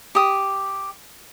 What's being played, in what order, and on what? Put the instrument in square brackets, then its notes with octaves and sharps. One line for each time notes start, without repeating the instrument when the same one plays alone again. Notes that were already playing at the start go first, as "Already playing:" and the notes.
[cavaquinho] G4 D#6